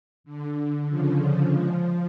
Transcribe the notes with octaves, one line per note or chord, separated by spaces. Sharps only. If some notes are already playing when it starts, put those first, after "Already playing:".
D3
C#3 F3
F3 G#3